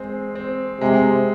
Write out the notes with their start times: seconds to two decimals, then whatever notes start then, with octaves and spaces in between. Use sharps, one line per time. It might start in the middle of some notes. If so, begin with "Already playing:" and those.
Already playing: G#3 C4
0.35 C4
0.81 C3 G#3